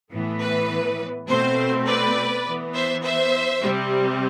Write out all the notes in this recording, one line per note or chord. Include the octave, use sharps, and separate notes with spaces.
A2 E3 B3
B4
B2 A3 C4 C5
B4 D5
E3 B3
C5 E5
C5 E5
C3 G3 C4